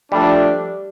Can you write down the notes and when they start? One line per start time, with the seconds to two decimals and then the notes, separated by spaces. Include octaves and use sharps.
0.12 F3 G3 A3 D4